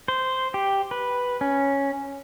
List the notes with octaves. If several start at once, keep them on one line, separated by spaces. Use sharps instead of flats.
C5
G4
B4
C#4